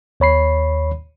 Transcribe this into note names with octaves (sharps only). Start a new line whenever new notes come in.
D#2 C#5 B5 C7